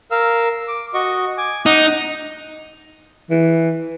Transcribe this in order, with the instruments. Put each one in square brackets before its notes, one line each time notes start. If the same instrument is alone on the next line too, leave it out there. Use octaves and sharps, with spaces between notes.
[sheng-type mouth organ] A#4 F5 E6
D6
F#4 D#5 C#6
G#5 D6
[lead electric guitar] D#4 [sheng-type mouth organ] F#5
[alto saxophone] E3